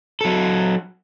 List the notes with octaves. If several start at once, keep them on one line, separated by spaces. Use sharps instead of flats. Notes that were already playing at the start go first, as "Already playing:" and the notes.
F#3 A4